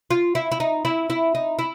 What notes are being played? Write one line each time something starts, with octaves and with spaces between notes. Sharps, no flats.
F4
E4
E4
D#4
E4
E4
D#4
E4